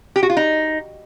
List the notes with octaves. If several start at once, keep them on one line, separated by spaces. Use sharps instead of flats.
G4
F#4
F4
D#4